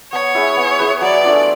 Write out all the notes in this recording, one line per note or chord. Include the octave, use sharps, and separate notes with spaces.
B3 C#5
E4 G#4 B4
B3
E4 G#4 B4
F#3 D5
A3 D4 F4